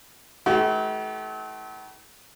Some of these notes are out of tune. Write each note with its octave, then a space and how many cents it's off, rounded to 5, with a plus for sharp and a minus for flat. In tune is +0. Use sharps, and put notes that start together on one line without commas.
E3 -45 A3 -40 F#4 +45